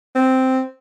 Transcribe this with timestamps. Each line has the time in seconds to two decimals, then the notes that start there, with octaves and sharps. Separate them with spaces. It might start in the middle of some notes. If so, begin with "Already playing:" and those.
0.15 C4